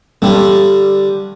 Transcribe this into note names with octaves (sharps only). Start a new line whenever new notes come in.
G2 D3 G3